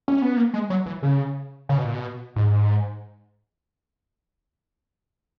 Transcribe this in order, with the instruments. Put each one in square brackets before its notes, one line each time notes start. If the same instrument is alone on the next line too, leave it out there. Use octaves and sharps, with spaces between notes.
[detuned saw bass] C#4
B3
A#3
G#3
F#3
E3
C#3
C#3
B2
A#2
B2
G#2